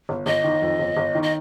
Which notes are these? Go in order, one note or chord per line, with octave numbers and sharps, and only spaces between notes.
G1
G1 D#5
D#3
F2
G1
G1
D#3
D#5